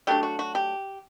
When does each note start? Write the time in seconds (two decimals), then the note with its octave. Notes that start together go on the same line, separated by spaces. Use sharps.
0.07 F#3 A3 D4 G4
0.23 F#4
0.39 F#4
0.55 G4